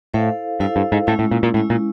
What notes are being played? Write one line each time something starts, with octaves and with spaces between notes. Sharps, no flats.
A2 E4 A4 C5 F5
G2 E4 A4 C5 F5
G2
G#2
A2 G#3 C#4 E4
A2
A#2
A#2
A2 G#3 C#4 E4
A#2